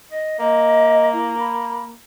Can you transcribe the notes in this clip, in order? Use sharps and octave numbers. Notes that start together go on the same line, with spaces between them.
D#5
A#3 D#5
E4
B5